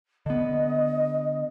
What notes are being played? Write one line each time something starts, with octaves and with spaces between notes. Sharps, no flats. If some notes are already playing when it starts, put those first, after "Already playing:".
D3 B3 D#5